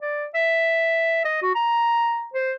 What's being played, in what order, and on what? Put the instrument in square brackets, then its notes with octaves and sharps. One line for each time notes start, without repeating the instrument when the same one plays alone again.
[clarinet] D5
E5
D#5
F#4
A#5
C5